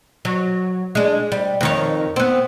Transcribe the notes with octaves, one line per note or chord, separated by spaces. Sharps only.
F#3
G#3 D4
G3
F2 D#3 C#5
B3 C4